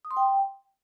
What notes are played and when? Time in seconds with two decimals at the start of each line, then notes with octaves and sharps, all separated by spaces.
0.05 D#6
0.11 C6
0.17 G5